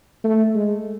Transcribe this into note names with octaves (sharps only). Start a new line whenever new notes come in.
A3
G#3